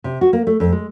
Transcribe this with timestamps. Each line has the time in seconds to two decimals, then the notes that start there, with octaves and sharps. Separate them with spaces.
0.04 C3
0.21 F#4
0.33 A#3
0.47 A3
0.60 F2
0.72 G#3